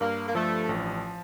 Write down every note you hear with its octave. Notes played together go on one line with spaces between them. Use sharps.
G2 A#3
A#3
F3 A3
A1